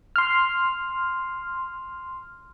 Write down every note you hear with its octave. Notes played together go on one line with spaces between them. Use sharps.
C6 F6